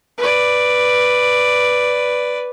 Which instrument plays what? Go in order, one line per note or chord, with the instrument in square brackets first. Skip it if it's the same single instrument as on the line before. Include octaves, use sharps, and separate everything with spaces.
[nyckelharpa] B4 D5